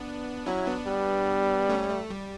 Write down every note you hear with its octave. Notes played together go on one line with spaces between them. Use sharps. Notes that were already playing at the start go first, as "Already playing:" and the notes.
Already playing: B3 D4
F#3 C#4 E4
B3 D4
G3
A3 C#4
A3
G3